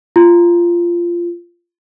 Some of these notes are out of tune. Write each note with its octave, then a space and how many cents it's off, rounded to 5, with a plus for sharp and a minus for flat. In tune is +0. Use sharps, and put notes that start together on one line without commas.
F4 -15